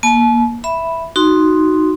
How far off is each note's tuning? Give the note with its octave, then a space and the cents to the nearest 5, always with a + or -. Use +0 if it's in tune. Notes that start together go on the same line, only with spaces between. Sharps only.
A#3 +20 A5 -40
E5 +0 B5 +0
D#4 +0 F#4 +0 C6 +0